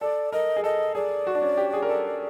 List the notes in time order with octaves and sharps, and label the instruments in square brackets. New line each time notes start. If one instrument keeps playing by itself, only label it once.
[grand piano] A4 [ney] D5
[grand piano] A#4 [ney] D#5
[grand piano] G#4
[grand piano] A4 [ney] D#5
[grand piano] G#4 [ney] D5
[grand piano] F#4
D4
C#4
G4
G#4
A#4
A4